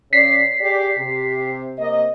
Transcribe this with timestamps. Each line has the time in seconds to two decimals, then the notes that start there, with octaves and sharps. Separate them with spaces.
0.13 C#3 D5 B6 C7
0.60 G4 G#4 D5
0.97 C3 G4
1.78 C3 A#3 D#5